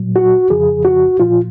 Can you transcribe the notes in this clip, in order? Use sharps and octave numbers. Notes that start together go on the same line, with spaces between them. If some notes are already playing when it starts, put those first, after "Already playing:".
Already playing: A#2 F#3
F#4
F2 C#3 F3 G#4
F#4
A#2 F3 F4